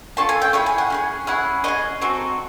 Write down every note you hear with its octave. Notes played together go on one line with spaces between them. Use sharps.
A3 C#4 F4 A4 A5
G#5
G5
C#4 E4 G#4 G5
G#5
F#5
C#4 E4 G#4
C#4 E4 G#4 F#5
C#4 E4 G#4 D#5
C4 D#4 F#4 A4